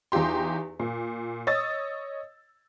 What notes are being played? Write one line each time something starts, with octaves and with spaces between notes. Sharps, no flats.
E2 D#4 F4 G4 C6
A#2
C#5 D#5 D#6 E6 A6